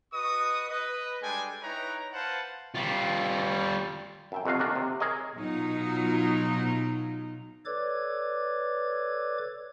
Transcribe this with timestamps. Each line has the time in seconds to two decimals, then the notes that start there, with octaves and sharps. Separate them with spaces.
0.13 F#4 B4 D#5 C#6 D#6
0.70 B4 D#5
1.22 G3 G#3 D4 A4 G5 G#5
1.63 D#4 E4 B4 C#5 G5 A#5
2.13 B4 C5 F5 F#5 A5
2.75 G3 F4
4.32 F#2 E5 G5
4.45 F2 C3 F#4 F5
4.59 F#2 D#3 D4 F#4 A#4
4.76 C3
5.00 G#4 A#4 C#5 D#5
5.35 B2 F#3 D#4 F4
7.66 A4 B4 C#5 D5 D6 G#6